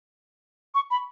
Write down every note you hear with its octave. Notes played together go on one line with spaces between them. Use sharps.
C#6
B5